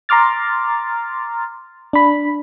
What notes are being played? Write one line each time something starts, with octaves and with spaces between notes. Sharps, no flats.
A#5 C6 D6 F6 A6
D4 B5